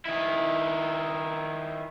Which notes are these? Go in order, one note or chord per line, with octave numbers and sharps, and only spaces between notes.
D#3 E4